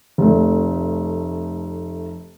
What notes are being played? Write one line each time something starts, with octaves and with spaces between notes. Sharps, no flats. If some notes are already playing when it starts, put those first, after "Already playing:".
F1 A3